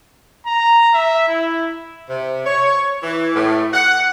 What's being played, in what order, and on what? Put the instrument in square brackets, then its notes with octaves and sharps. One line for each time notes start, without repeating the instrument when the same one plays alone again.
[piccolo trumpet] A#5
E5
E4
[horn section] C3
C#5
E3
A2
F#5